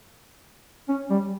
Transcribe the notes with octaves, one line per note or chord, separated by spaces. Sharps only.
C#4
G3